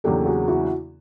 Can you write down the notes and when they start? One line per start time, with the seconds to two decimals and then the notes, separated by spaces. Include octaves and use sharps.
0.04 E2 C#3 F#3 A#3 D4 G4 A4
0.26 F#4 G#4
0.48 E4 F#4